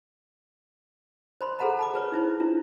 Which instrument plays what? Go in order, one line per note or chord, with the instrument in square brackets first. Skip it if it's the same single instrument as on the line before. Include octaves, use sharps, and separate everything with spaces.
[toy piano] C5 B5 C6
G#4 A4 C5 F#5 A#5 B5
A5 B5 D6
G#4 B4 C#5
D#4 E4 C5
D4 E4 F4